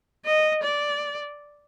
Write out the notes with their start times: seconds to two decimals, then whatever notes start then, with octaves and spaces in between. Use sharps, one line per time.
0.26 D#5
0.64 D5